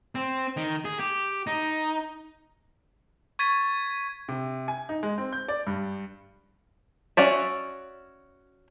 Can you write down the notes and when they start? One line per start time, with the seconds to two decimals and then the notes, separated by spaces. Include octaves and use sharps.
0.15 C4
0.57 D#3
0.85 G#4
1.00 G4
1.47 D#4
3.39 C#6 G#6 A6 B6 D#7
4.28 C3
4.68 G#5
4.89 D#4
5.03 G#3
5.18 C4
5.33 G6
5.48 D5
5.67 G2
7.17 C#4 F#4 D5 E5